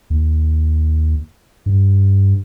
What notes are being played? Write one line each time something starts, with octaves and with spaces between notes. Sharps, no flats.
D#2
G2